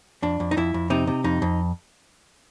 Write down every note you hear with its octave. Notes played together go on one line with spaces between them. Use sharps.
F2 D4
F2
D#4
F2 E4
F2
C3 D#4
C3
F2 D#4
F2